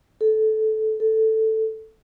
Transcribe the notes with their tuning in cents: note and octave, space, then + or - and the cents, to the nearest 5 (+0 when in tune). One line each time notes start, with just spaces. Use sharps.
A4 -15
A4 +5